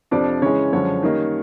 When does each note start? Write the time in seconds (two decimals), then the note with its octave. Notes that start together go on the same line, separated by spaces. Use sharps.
0.11 F2 C3 F3 D4 D5
0.42 C#3 E3 G#3 C#4 C#5
0.72 F#2 D3 F3 G#3 C#4 C#5
1.03 D#3 G3 A#3 D#4